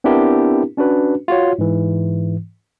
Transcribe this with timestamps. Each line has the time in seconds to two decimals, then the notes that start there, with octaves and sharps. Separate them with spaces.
0.04 B3 C4 D4 E4 G4 A#4
0.77 C#4 D4 F#4 B4
1.28 F4 F#4 C#5
1.59 G#2 E3